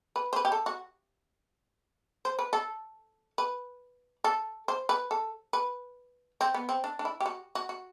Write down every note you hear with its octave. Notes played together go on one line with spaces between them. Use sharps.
B4
C5
B4
G4
A4
F#4
C5
B4
A4
B4
A4
C5
B4
A4
B4
C4
B3
C4
D4
D4
E4
G4
F#4
F#4
F#4